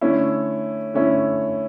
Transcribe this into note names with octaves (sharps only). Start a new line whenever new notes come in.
D3 A3 C#4 E4
D3 A3 C#4 E4